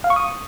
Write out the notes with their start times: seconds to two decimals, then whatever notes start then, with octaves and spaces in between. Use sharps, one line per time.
0.04 F5
0.10 C#6
0.16 D#6